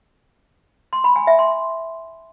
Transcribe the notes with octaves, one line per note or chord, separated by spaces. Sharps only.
C6
B5
G#5
E5
C6